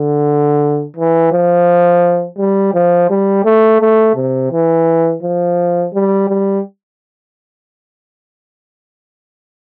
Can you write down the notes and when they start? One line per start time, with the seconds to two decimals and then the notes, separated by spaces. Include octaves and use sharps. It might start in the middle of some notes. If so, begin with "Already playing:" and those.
Already playing: D3
0.97 E3
1.32 F3
2.39 G3
2.74 F3
3.10 G3
3.45 A3
3.81 A3
4.16 C3
4.52 E3
5.23 F3
5.94 G3
6.29 G3